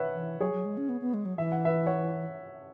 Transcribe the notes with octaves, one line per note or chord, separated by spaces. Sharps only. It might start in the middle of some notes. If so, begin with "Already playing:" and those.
Already playing: B4 C#5 E5 F#5
E3
F#3 G#4 C#5
F#3
G#3
C#4
B3
B3
G#3
F#3
E3 E5
F#5
B4 E5
C#5 F#5